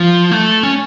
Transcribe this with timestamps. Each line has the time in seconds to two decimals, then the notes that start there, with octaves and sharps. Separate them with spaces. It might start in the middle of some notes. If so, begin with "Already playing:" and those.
Already playing: F3
0.31 A3
0.63 C#4